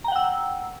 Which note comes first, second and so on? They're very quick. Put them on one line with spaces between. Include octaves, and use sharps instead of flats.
A#5 G5 F#5 E6